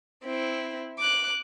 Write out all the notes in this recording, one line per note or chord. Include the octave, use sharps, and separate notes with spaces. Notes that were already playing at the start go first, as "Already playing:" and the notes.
C4 E4
D6 F#6